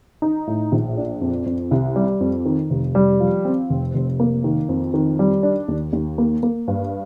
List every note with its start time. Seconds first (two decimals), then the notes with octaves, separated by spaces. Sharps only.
0.22 D#4
0.47 A2
0.72 A#1
0.97 D4
1.21 F2
1.46 F2
1.71 C2
1.96 G3
2.21 F2
2.46 D#3
2.70 F1
2.95 G3
3.20 F3
3.45 C4
3.70 F1
3.94 F1
4.20 A#3
4.44 D#3
4.69 F2
4.94 D#3
5.19 G3
5.43 D4
5.68 D#2
5.93 D#2
6.18 A#3
6.43 A#3
6.68 G2